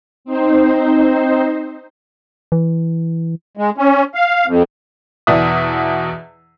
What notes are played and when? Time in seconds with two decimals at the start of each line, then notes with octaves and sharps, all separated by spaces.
0.25 C4 D#4 C5
2.52 E3
3.57 G#3
3.78 C#4
4.15 F5
4.46 F2
5.27 E2 B2 D5 E5 D#6